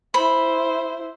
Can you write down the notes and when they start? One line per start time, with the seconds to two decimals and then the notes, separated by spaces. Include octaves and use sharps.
0.14 E4 C5 B5